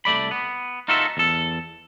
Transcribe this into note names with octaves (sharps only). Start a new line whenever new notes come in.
C2 A3 D5 B5
B3
D#4 F4 F#4 A4 A#4 E5
E2 A4